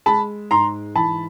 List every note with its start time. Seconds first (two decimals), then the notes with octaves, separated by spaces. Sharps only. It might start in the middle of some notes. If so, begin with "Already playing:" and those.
0.06 G#3 A5 B5
0.51 G#2 A#5 C6
0.95 E3 A5 B5